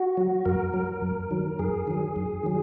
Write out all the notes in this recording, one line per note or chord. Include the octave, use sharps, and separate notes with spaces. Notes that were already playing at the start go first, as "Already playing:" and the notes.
Already playing: F#4
F#3
F#2 A#4
F#3
F#2
D#3 F#3
F#2 G#4
D#3 F#3
F#2
D#3 F#3